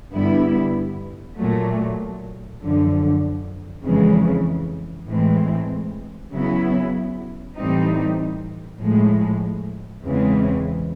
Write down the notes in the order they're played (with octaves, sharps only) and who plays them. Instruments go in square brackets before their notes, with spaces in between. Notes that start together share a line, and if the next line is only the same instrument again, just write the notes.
[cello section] G2 D3 G3 B3 E4
A#2 F#3 A3
F#2 D3 F3
F2 C#3 E3 G#3
A2 E3 G#3 C4
C#3 F#3 B3 E4
A2 E3 G3 C4 D#4
A2 F3 G#3
E2 C#3 E3 G#3 C4